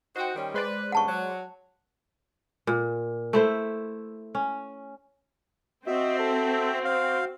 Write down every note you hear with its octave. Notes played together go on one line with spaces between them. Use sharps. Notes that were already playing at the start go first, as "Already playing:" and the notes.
D#4 F#4 C5 G5
D#3 G3 C#4
G#3 B4 C5 D5
E2 G2 C#3 F#5 A5 C#6
F#3
A#2
A3 E4 C5
C#4
C4 F#4 D#5 E5
A4
C5 F5